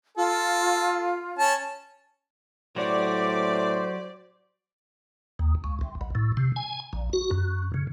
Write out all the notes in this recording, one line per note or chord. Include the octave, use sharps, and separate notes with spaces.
F4 A4
C#4 A5
A2 F#3 F#4 G4 C5 D5
D#2
C#2
C2
B1
A2
C3
G#5
A#1
F#4
F#2
C#3